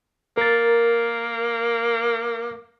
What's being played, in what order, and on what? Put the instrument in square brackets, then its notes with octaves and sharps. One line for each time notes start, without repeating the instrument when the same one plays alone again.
[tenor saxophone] A#3 [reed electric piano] A#4 A6